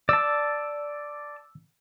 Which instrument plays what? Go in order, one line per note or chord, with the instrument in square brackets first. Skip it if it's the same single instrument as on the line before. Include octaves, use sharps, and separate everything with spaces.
[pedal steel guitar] D5 A5 [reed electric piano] E6